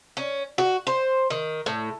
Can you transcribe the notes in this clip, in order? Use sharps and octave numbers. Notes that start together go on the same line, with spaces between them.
C#4
F#4
C5
D#3
A2